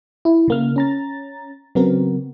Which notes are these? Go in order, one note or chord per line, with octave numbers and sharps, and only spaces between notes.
E4
C#3 A#3 F6
C#4 A#5 A6
C#3 F#3 B3 C4 F#4 A#4